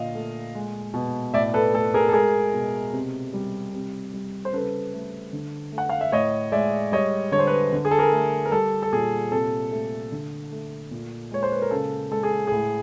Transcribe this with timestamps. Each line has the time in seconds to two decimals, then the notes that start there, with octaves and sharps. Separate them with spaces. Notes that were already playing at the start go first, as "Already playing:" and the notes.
Already playing: A#2 D3 D#5 F5
0.15 A3
0.55 G#3
0.94 B2
1.34 A2 D5 E5
1.54 A4 B4
1.73 A3 A4
1.94 G#4 A#4
2.09 A4
2.13 G#3 G#4 A#4
2.53 B2
2.93 C3
3.34 G3
3.73 C3
4.14 G3
4.45 C5
4.53 C#3 A4 B4
4.94 A3
5.33 D3
5.72 A3
5.78 F#5
5.89 F5
6.01 E5
6.12 A2 C#5 D#5
6.52 G#3 D5 E5
6.92 G3 C#5 D#5
7.32 D3 C#5
7.39 C5
7.47 B4 C#5
7.73 D3
7.85 G#4
7.91 A4
7.99 G#4 A#4
8.12 A3
8.46 A#4
8.52 G3 A4
8.82 A4
8.92 A#2 G#4
9.31 C3 A4
9.72 A3
10.12 D3
10.52 A3
10.91 A#2
11.31 G#3 C#5
11.43 C5
11.52 B4
11.62 A#4
11.71 C#3 A4
12.11 G#3 A4
12.23 G#4
12.47 A2 G#4